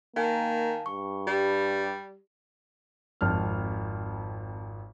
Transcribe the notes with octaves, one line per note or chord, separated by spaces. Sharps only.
D#3 A#3 F5 G#5 A5
G2 C#6
G3 G4 D5
G#1 F2 A5 F6